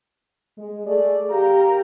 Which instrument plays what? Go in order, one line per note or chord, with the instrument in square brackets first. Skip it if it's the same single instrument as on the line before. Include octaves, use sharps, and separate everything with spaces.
[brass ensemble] G#3
A3 G#4 D5
[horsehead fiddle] G4 A#4 [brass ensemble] F5 A#5